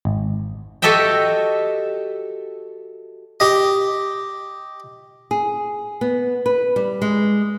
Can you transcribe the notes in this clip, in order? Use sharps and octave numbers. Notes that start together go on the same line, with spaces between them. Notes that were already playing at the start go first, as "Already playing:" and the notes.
G#1
F#4 G4 A4 D#5 E5 G5
G4 D#5
G#4
B3
B4
G3
G#3